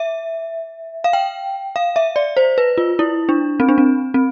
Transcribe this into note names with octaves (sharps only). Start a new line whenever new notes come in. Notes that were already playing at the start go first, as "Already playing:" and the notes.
Already playing: E5
F5
G5
F5
E5
D5
C5
B4
F4
E4
D4
C4
D4
C4
C4